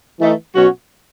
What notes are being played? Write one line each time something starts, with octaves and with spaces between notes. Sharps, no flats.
E3 A3 D#4
B2 F#3 C#4 F#4